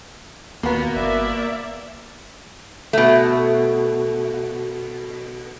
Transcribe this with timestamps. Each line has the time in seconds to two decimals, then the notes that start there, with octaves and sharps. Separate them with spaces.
0.63 D#1 B2 A#3 B3
0.96 G1 D5 E5
2.93 B2 A3